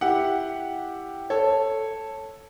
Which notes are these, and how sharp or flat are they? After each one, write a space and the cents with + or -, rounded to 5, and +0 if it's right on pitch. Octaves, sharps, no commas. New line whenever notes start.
E4 +5 G4 +0 F#5 +0
A4 +0 C#5 -10